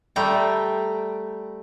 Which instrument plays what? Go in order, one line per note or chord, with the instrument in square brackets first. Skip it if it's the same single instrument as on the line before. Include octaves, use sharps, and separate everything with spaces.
[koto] G3 A3 G5 A#5